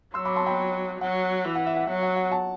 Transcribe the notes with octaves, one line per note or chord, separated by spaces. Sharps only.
F#3 C6 E6
B5 D6
A5 C6
G5 B5
F#3 F#5
E3
F#5
E5
F#5
F#3 F#5
F#5
F#5
F#5 A5